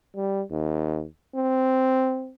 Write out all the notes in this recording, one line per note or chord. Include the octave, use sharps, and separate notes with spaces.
G3
D#2
C4